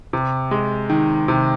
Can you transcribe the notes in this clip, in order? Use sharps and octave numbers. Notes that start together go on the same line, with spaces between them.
C3
G#3
D#3
C3